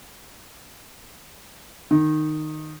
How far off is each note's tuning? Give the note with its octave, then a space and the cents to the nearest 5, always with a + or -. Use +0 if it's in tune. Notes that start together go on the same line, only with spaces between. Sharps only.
D#3 -10